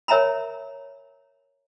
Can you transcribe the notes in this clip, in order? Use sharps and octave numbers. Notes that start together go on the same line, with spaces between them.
A#4 C#5 E5 G#5 A#5 B5